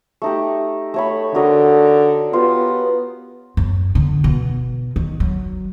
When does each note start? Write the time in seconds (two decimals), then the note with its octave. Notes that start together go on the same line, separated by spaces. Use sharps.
0.22 A3 D#4 G4
0.94 A3 C#5 B5
1.35 D3 F#4 A#4 D#5
2.33 B3 F4 G4
3.57 F#2
3.95 D3
4.24 B2
4.96 D#3
5.20 F#3